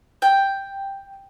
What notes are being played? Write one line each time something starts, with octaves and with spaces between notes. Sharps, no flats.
G5